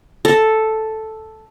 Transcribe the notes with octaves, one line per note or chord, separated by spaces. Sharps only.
A4